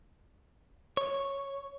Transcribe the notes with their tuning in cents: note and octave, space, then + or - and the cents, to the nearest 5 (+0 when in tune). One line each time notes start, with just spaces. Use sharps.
C#5 -5